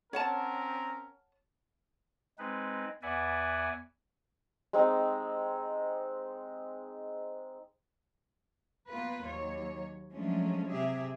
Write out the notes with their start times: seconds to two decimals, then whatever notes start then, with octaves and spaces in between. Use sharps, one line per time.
0.13 C4 C#4 A#4 C#5 F#5 A5
2.38 G#3 C4 D#4 B4
3.02 E2 B4 D5 E5 F#5 G#5
4.73 G#3 C4 D#4
8.88 A#3 B3 F4 B4
9.25 D#2 F#3 C#5
10.13 F3 F#3 G#3 A3 C#4 D4
10.69 C3 G4 G#4 E5